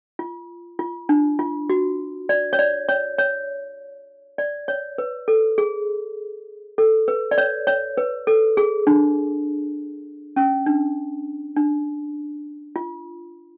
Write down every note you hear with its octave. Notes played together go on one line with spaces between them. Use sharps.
F4
F4
D4
F4
F#4
D5
C#5
D5
C#5
C#5
D5
C#5
B4
A4
G#4
A4
B4
D5
C#5
C#5
B4
A4
G#4
D4
C#4
D4
D4
F4